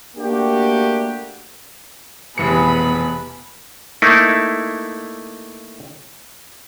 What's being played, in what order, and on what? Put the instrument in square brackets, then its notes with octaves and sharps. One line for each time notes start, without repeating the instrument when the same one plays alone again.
[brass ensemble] A3 A#3 D4 F#4 G4
[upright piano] F1 E3 C#7 [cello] B2 [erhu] G#4 [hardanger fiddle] B4 B5
[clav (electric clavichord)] A3 A#3 D#4 E4